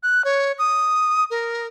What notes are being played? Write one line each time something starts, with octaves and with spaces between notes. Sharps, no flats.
F#6
C#5
D#6
A#4